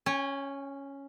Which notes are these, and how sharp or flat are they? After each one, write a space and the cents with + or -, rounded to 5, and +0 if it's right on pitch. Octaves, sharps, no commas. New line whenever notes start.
C#4 +0 G#5 -45